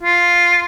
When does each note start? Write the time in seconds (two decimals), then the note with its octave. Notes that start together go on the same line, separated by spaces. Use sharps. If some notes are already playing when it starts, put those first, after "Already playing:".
0.03 F4